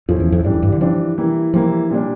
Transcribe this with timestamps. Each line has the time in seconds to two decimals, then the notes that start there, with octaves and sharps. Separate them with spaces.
0.09 F2 F3 C#4 E4
0.20 E2
0.32 F2
0.44 G2 E3 G3 D4
0.54 F2
0.63 G2
0.72 D3
0.81 E3 F3 G3 D4
1.18 E3 G3 A#3 E4
1.54 E3 F3 G3 A#3 E4
1.90 A#2 G3 D4